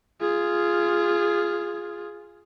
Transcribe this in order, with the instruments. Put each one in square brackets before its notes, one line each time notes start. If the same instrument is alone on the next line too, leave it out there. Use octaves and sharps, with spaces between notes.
[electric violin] F4 G#4